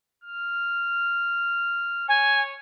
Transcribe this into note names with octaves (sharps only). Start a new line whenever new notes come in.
F6
C#5 G#5